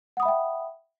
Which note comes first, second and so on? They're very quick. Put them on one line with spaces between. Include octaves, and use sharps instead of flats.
F#5 D#6 B5 E5 G5